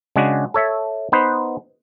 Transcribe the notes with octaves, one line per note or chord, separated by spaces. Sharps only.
C#3 G#3 D4 F#4
A4 C#5 E5
B3 D#4 B4 C5